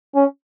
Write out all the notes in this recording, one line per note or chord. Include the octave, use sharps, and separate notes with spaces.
C#4